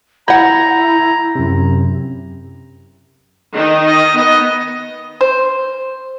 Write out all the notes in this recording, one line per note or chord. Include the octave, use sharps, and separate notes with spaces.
E4 B4 F#5 A#5 B5 G6 G#6
F#2 C3
D#3 D#4
D#5
B3 D#5
C5